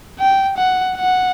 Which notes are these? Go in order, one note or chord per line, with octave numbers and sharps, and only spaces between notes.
G5
F#5
F#5